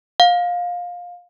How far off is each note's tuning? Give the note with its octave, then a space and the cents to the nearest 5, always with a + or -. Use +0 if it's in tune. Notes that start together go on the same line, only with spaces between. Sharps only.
F5 +20